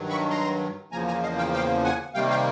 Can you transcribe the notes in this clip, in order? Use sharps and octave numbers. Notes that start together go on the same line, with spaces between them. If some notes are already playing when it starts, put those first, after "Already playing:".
Already playing: G2 D#3 F#3
B5 C#6
A#5 C6
E2 C#3 F3 A#3 G#5 A#5
G#5 A#5
D#5 F5
F5 G5
F5 G5
F#5 G#5
C3 D#3 G3 A#3 F5 G5
F5 G5